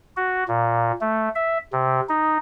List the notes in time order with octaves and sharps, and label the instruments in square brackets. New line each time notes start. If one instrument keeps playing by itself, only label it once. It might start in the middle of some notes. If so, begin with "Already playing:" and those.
[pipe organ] F#4
A#2
A3
E5
C3
D#4